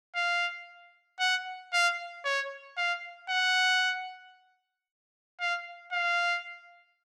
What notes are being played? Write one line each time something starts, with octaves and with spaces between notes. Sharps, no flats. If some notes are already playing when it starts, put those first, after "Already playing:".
F5
F#5
F5
C#5
F5
F#5
F5
F5